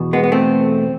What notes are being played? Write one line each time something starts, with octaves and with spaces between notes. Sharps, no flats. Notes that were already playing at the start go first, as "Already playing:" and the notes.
Already playing: E2 B2
G#3 B3
B3
A3 C4